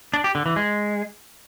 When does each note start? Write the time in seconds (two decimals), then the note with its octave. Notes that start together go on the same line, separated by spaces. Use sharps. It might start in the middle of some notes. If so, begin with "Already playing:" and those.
0.14 D4
0.24 G4
0.35 D3
0.46 E3
0.56 G#3